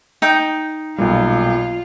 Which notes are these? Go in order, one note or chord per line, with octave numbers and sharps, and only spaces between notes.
D#4 G5 D#6
B1 A#2 G3 F4